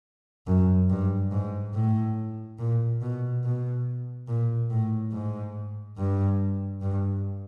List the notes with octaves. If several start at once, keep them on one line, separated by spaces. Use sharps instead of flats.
F#2
G2
G#2
A2
A#2
B2
B2
A#2
A2
G#2
G2
G2